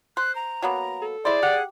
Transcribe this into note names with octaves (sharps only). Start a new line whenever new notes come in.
C5 F#6
A#5
F#3 A#3 B3
A4
E4 G#4 C5 D5
G4 F#5